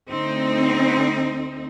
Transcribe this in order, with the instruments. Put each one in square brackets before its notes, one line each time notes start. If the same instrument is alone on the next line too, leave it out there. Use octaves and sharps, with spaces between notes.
[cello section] D2 C4 D#4